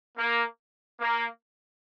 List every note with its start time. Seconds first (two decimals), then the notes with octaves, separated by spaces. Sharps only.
0.17 A#3
1.00 A#3